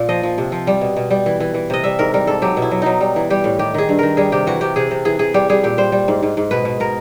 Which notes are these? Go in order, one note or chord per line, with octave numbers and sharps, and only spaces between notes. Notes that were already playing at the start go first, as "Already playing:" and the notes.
Already playing: A#2
F3 D#5
F3
C3
F3
G3
B2
B2
G3
E3
E3
E3
C3 D#5
G3 E5
G#2 A#4
G3 A#4
G#2 A4
F#3 G4
B2
E4
F#3
F#3 D#4
G3
E3
G3 G4
A2
D#3 G4
D#3 G#4
G2
D#3 A#4
G3 G#4
C3 G4
E3 F#4
C3 G4
C3 G#4
C3
E3 G#4
E3 G#4
G3 G4
G3 G#4
A#2 G4
G3 C5
G3
G#2
G#2
G#2
B2 B4
B2
B2 A#4